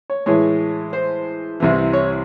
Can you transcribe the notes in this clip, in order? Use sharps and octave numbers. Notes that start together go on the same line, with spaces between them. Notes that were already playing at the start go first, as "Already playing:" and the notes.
C#5
A2 E3 G#3 C#5
C5
C2 C3 E3
C#5